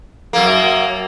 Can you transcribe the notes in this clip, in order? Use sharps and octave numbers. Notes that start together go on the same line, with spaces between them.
F#2 A#3